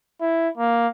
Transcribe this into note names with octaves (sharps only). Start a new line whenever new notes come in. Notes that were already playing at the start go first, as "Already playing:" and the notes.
E4
A#3